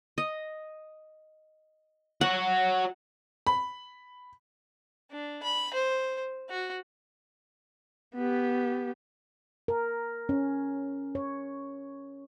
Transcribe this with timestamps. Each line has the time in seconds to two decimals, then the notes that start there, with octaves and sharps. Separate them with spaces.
0.18 D#5
2.21 F#4 C#5 F#5
3.47 B5
5.12 D4
5.43 B5
5.74 C5
6.50 F#4
8.15 B3 G4
9.68 A#4
10.29 C#4
11.15 C#5